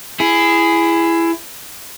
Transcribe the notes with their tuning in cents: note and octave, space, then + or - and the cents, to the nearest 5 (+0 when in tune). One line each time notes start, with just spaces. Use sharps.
E4 +20 G#4 +0